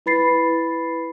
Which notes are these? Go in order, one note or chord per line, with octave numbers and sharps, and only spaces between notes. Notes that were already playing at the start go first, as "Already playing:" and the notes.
E4 B4 B5 A6 C7